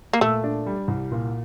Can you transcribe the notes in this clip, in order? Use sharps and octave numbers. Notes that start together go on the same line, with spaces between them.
A#3
A#2 A3
D4
G3
C2
A#2